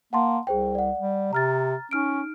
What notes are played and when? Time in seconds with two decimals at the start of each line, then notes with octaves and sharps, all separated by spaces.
0.13 A#3 F#5 A5 C6
0.47 C2 G#4 C5 G5
0.75 D5 F#5
0.99 G3
1.33 C3 A#5 F6 A6
1.91 C#4 D#4 F6 D7